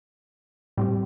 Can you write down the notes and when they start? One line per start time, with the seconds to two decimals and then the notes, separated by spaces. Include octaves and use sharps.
0.77 A2 G3 C4 G4